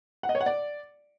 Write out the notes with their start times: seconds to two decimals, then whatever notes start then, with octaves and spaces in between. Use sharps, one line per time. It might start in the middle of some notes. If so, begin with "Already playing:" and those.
0.23 F#5
0.29 D#5
0.35 C#5
0.41 F#5
0.46 D5